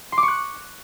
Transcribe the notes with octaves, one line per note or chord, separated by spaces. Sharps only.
C6
D6
C#6
F#6